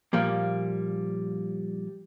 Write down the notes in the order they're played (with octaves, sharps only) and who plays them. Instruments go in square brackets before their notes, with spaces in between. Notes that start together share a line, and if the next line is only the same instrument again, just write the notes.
[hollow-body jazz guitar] A#2 F3 G3 A#3